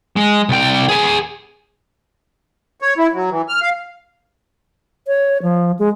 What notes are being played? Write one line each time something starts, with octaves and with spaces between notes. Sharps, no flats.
G#3
C2 G5
G#4 B4
C#5
E4
F#3
E3
F6
F5
C#5
F3
G#3